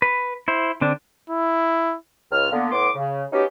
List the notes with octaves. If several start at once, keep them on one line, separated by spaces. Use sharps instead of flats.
B4
E4 C5
D3 C4 D4
E4
C#2 F6
D3 A#3 B3
A2 B3 C6 D6
C#3
B3 C#4 D#4 F#4 G4